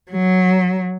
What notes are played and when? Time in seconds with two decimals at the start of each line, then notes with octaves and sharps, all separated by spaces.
0.11 F#3